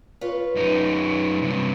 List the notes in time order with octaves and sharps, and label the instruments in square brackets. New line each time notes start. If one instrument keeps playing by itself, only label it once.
[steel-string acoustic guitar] F4 B4 C#5
[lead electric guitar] F#2 D#4
G2 C3